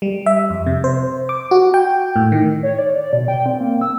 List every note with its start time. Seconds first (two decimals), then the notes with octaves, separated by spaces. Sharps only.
0.02 G3
0.26 E5
0.50 F2
0.66 C3
0.84 C5
1.29 D6
1.51 F#4
1.74 G5
2.16 A2
2.32 D#3
2.63 C#5
2.78 D5
2.97 D5
3.13 B2
3.28 G5
3.46 C4
3.61 A#3
3.81 E6